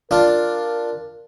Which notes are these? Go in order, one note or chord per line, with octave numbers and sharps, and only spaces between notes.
D4 F4 A#4